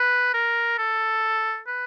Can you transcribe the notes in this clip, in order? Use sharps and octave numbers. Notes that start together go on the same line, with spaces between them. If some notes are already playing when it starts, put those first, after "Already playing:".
Already playing: B4
A#4
A4
B4